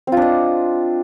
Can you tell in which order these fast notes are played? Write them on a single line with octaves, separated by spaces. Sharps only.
C4 F4 D4 D#5